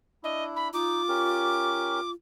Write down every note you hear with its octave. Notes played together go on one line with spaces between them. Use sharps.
D4 E4 D#5
B5
D#4 F4 D6
C#4 G4 A#4